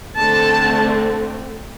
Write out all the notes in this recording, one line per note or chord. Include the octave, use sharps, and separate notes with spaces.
D3 A3 C4 A5